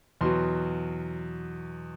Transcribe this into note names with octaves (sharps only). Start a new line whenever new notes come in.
E2 B2 F#3 C6